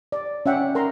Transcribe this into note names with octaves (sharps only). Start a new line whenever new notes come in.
D5
C#4 E5 F#5 G5
A#4 A#5 C6